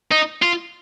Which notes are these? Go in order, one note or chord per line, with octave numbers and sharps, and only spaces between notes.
D#4
F4